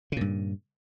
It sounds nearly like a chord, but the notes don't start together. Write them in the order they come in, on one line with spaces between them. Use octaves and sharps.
C#3 A#2 G2